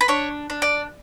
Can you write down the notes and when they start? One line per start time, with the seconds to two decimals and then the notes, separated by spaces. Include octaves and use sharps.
0.01 B4
0.08 D4 C#5
0.50 D4
0.62 D5